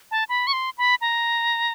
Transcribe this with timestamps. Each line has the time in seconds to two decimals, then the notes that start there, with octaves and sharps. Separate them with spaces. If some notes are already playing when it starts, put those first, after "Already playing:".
0.11 A5
0.29 B5
0.47 C#6
0.53 C6
0.78 B5
1.01 A#5